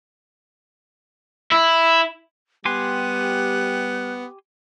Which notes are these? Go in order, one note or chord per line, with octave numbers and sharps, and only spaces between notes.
E4
G3 B3 G4 G#5 C6 F#6